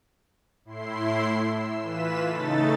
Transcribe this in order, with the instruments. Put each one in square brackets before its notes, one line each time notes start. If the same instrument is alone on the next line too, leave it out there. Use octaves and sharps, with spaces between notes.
[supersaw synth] A2 E4 C6 C7
E6
E3 F4 B4 B6 E7
C#3 A3 D#4 A4 A6